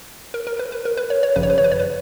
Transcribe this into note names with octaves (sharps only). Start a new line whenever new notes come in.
A#4
A#4
B4
B4
A#4
B4
C#5
C#5
G#1 F#2 C#3 F3 B4
C#5
B4
C#5
B4
C#5
B4